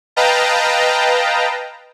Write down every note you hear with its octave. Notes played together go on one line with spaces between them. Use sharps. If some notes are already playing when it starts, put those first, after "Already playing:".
B4 D#5 F5 G5 A5 A#5